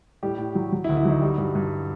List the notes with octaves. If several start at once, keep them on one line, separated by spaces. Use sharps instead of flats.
A2 G3 G4
A2
F#3
F#3
E4
D2
E4
F#3 D#4
G3
G2
G2